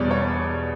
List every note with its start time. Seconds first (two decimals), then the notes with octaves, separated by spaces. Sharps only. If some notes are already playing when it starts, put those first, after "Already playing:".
Already playing: E1 E2 B2 G3 C#5 D5
0.11 C#5